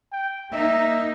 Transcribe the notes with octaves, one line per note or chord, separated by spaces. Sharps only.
G5
A#3 D#4 E5